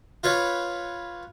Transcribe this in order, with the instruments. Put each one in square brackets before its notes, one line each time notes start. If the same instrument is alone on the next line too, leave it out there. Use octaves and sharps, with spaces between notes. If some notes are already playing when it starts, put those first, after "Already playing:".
[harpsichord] F4 B4 C#5